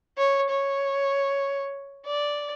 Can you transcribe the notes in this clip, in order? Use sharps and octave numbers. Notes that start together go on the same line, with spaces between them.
C#5
C#5
D5